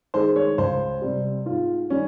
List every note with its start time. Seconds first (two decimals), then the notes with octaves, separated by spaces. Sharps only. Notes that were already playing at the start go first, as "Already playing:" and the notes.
0.14 D#3 G#3 C5
0.36 C#5
0.58 C#2 C5
1.01 C3 G3
1.46 G#2 F4
1.90 D#3 G3 C#4